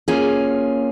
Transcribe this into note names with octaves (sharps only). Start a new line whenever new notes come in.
A#3 C#4 F4 G#4